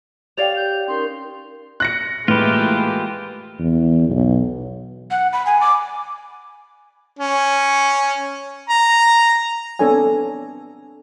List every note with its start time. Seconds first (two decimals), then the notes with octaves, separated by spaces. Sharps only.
0.37 G4 C#5 D5 F5 G5 F7
0.56 G6
0.88 C#4 D#4 A#4 C6
1.80 F#6 A#6 C#7
2.28 A2 E3 G#3 A#3 F4 G4 B4
3.59 E2
4.10 B1
5.11 F#5
5.33 B5
5.46 G#5
5.61 D6
7.19 C#4
8.69 A#5
9.79 B3 C4 D4 A4 C#5 G#5